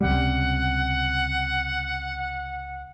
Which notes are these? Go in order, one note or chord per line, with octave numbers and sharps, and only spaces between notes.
C#2 C3 G3 F#5